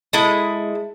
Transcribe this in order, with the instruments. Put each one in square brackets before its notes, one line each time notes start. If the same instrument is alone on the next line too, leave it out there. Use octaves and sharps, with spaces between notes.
[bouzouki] G#3 [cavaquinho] E4 A4 D#6